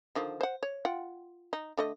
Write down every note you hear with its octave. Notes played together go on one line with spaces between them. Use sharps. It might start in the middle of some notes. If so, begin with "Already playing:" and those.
D3 D#3 F3
C5 F#5
C#5
F4 F#5 G5
D#4
D3 A3 D#5